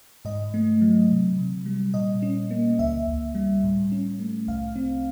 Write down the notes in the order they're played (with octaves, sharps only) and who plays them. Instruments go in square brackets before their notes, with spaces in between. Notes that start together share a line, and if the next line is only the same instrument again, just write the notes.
[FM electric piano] G#2 D#5
A3
F#3
C3
C3
G3
A#2 D#5
C#4
A#3
C#2 E5
C#2
G3
A2
C#4
A3
C2 F5
C4